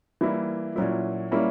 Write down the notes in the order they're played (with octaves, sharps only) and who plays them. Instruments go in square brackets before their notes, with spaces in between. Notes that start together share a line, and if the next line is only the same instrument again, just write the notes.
[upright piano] E3 G3 A#3 E4
A#2 F#3 C#4 E4
G3 A#3 C#4 E4